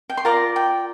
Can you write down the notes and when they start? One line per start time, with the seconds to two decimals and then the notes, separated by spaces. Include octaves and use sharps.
0.09 G5
0.17 C6
0.25 F4 A#4 D5 A#5
0.56 G5